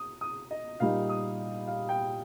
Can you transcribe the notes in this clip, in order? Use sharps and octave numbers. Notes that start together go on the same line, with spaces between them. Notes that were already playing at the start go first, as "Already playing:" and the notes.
Already playing: D#6
D#6
D#5
A#2 G3 D#4 F5
D#6
F5
G5